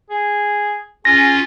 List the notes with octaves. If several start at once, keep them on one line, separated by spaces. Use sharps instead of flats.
G#4
C#4 F4 G#4 A#6